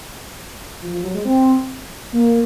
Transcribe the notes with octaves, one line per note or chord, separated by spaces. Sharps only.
F3
F3
F#3
G#3
C4
A#3